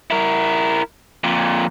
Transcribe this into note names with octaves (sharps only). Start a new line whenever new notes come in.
E4 A#4
F2 A#2